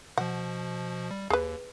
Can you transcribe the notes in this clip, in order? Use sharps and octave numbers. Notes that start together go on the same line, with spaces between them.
B2 F3 F#5
G3
D#2 G#4 B4